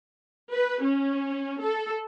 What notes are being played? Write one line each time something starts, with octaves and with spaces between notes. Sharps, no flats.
B4
C#4
A4